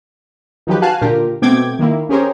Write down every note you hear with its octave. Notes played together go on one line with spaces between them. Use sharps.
D#3 F3 F#3 D#4 G4 B4
F#4 F5 G#5 A5 F#6
A#2 D3 F4 G4 A#4
B2 A3 C4 G5 D6 G#6
D#3 A#3 E4
C#4 G4 G#4 A#4 C5 C#5